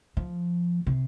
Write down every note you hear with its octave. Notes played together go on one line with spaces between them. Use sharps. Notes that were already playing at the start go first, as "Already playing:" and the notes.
F3
C3